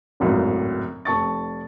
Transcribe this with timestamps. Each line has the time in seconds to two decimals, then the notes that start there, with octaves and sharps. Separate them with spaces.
0.20 G#1 C#2 F#2 A2
1.05 F1 A5 C#6 A6